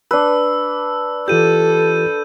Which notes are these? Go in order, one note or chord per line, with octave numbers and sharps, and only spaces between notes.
D4 B4 E6
E3 F4 G4 A4 G6 D#7